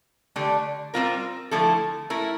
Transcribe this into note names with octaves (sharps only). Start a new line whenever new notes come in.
D3 A3 D4 G4
G3 C4 F4 A#4
D3 F3 A3 E4 A4
A3 E4 A#4